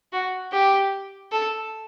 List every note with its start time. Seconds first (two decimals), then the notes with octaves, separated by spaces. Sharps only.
0.13 F#4
0.52 G4
1.32 A4